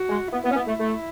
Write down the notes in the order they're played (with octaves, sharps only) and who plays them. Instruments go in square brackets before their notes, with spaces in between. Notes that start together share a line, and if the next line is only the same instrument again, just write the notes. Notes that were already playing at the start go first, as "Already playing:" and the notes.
Already playing: [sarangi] F#4
[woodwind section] G#3
[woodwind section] B3 [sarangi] E4
[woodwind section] B3
C#4
B3
A3
A3